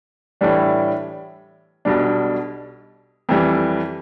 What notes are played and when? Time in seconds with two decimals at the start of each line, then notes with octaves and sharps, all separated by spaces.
0.41 A2 E3 G3 D4
1.85 B1 B2 G3 D4
3.29 F2 E3 G3